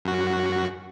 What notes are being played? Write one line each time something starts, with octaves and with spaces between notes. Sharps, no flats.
F#2 F#4